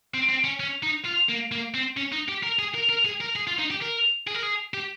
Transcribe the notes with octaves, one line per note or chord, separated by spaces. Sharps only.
C4
C4
C#4
C#4
D#4
F4
A#3
A#3
C4
C#4
D#4
G4
A#4
G#4
A#4
A#4
G#4
A#4
G#4
F4
D#4
G4
A#4
G#4
A#4
G#4
G4